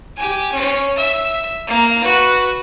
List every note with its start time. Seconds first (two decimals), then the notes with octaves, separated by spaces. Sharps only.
0.17 G4 G#5
0.53 C#4
0.96 E5
1.67 A#3 A#5
2.02 F#4 B4